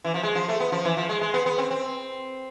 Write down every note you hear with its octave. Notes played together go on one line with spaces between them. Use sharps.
E3
F3
G#3
F3
A3
B3
F3
E3
F3
G#3
G#3
B3
B3
C4
C4